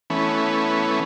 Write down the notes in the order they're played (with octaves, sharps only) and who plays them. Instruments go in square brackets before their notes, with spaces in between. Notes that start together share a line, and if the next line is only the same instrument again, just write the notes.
[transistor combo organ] E3 A3 B3 C#4